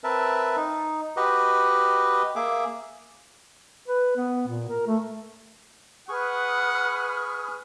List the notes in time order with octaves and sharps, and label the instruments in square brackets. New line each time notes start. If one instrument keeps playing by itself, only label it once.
[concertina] C4 A#4 B4 E5 A5
D#4
F#4 G4 B4 D#5
A#3 G#4 E5 D6
[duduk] B4
B3
A#2
A#4
A3
[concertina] G#4 C#6 [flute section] B4 D#6 F6 [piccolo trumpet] F#5